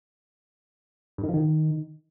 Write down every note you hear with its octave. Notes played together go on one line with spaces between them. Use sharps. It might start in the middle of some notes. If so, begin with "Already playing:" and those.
G2
D#3
F3
D#3